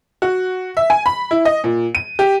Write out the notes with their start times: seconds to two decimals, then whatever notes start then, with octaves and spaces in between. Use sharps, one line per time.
0.22 F#4
0.77 E5
0.90 G#5
1.06 B5
1.31 E4
1.45 D#5
1.64 A#2
1.95 D#7
2.19 G4